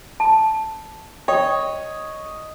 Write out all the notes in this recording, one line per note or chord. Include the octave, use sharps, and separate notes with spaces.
A5
C#5 D#5 G5